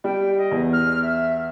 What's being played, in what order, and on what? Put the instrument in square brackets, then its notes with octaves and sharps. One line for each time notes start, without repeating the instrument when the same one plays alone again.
[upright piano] G3 [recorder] G5
[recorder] D#5
[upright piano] E2
[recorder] F6
E5